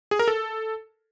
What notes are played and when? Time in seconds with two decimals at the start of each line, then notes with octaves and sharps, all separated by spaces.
0.11 G#4
0.19 A#4
0.28 A4